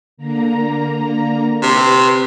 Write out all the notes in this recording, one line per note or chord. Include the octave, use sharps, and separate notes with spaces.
D3 A#3 A#5
C3 B4